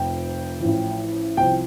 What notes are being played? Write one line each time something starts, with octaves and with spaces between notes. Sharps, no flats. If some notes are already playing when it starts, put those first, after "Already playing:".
Already playing: F1 F2 F3 G5
A1 A2 F3
C2 C3 F3 G5